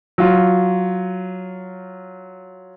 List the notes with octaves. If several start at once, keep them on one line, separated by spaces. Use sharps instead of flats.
F#3 F4